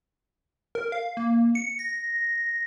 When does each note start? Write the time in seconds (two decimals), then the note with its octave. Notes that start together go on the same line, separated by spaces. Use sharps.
0.75 A#4
0.92 F5
1.17 A#3
1.55 C#7
1.79 A#6